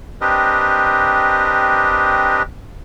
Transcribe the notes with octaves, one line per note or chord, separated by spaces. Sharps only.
C4 D4 G4 A#4 B4 D#5